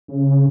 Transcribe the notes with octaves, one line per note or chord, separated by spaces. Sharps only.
C#3